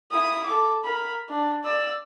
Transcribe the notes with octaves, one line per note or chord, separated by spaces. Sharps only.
E4 D#6
A4 D6
A#4 B5
D4
D5 E6